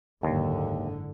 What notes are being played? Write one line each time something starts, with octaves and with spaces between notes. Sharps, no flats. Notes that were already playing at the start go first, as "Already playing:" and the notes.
F#1 D#2 G#2 D3